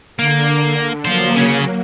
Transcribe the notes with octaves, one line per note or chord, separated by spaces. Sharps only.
D3 A#3
F#3 A#3 F4 C5
C#3 C#4